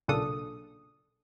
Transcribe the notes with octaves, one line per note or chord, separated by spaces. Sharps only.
B1 A#2 C#3 D4 A4 D#6